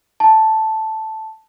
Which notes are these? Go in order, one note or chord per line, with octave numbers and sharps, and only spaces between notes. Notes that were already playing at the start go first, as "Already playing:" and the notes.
A5